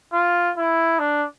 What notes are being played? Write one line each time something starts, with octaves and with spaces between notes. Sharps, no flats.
F4
E4
D4